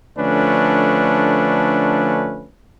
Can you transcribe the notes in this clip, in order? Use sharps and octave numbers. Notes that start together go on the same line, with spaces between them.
D3 F3 A3 C#4 D4 B4